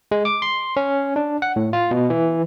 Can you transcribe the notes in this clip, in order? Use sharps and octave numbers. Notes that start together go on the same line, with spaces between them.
G#3
D6
C6
C#4
D4
F#5
A2
F4
B2
E3